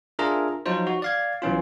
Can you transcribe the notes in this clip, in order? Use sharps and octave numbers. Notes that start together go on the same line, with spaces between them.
D4 F4 G#4 A#4 E5 A#5
F3 F#3 D#4 F4 C5
F#4
D5 F5 G#6
B1 E3 C#4 F4